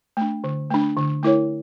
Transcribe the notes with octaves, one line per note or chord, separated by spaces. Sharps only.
A3 D4
D3
A3 D4
D3
A3 E4 A#4 C#5